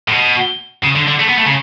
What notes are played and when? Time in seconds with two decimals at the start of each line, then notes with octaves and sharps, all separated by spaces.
0.08 A2
0.12 B2
0.84 C#3
0.96 D3
1.07 D3
1.19 A3
1.29 B3
1.38 A3
1.47 C#3